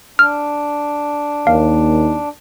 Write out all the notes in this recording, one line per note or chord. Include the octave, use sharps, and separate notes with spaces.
D4 F6
D#2 F5